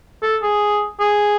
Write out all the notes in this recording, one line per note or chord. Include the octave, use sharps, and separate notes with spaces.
A4
G#4
G#4